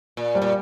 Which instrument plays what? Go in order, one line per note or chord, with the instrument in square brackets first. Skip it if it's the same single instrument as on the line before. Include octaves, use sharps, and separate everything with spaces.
[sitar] A#2
[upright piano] G3
[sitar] A#2